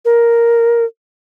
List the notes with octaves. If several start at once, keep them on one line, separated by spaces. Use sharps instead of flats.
A#4